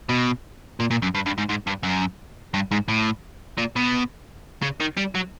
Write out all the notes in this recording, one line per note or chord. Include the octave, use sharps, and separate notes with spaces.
B2
A#2
A#2
F#2
G2
G2
G#2
G#2
G2
F#2
G2
G#2
A2
A#2
B2
C#3
D#3
G3
F#3